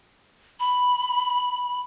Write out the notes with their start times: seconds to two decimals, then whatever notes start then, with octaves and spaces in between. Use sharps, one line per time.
0.60 B5